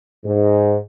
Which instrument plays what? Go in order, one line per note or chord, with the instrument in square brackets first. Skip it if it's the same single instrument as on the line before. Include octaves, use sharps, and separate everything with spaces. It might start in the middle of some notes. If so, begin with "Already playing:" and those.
[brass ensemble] G#2